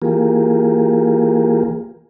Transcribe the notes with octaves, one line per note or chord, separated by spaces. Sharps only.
E3 A#3 F4 G4 G#4 A#4